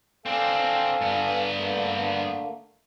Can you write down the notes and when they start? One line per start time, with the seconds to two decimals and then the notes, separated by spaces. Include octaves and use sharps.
0.26 C4 D4 A4 F5 G#5
1.01 G2 B3
1.57 D3 A3 A#3